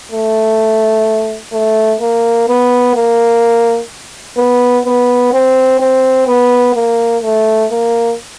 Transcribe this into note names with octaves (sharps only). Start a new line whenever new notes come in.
A3
A3
A#3
B3
A#3
B3
B3
C4
C4
B3
A#3
A3
A#3